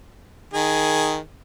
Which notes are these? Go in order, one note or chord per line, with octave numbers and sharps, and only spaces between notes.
D#3 G#4